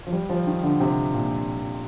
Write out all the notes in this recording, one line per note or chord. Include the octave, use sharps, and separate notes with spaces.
F3
G3
F3
D#3
D3
C3
A#2